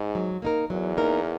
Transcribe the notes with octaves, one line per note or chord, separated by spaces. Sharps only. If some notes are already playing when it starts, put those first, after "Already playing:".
Already playing: G#2
F#3
A#3 D#4 A#4
E2 F#3
A#3 D#4 A#4